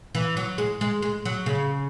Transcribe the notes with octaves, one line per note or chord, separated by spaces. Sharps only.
E3
F#3
G#3
G#3
G#3
F#3
C#3